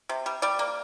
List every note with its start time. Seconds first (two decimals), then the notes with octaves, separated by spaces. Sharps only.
0.09 C3
0.26 G3
0.42 G3 D5
0.59 A#3